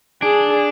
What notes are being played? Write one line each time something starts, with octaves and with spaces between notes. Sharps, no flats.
D4 G#4